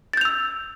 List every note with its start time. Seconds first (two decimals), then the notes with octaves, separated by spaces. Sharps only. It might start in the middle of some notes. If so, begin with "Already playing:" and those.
0.13 A6
0.17 G6
0.21 F7
0.25 E6